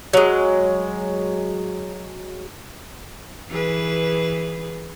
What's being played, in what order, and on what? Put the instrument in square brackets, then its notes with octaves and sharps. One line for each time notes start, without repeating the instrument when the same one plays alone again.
[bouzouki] F#3 G#3
[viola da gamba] E3 G#4 B4